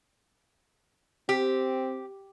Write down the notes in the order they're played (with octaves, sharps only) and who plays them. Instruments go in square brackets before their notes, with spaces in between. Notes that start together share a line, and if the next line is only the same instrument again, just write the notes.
[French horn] C4 [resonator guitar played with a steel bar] G4